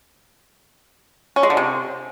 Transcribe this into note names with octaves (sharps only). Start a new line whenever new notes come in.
C#4
G#3
D3
C3